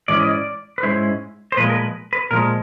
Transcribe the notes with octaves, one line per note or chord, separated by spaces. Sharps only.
G#2 E3 C#4 E4 D5
D#5
D5
B4
G#2 E3 G#3 C#4 E4 C5
C5
A#2 F3 G#3 B4
A#4
B4
B4
A#2 F3 G#3 A#4